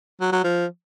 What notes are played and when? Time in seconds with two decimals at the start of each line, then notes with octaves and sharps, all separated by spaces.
0.21 F#3
0.32 F#3
0.44 F3